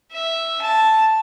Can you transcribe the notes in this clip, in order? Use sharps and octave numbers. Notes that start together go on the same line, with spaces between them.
E5
A5